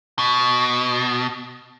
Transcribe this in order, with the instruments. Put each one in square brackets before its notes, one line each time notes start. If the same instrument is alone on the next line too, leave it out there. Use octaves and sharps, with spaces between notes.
[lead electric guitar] B2